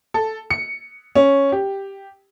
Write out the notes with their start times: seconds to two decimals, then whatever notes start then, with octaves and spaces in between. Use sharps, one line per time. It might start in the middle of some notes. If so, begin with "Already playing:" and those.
0.14 A4
0.50 C#7
1.16 C#4
1.52 G4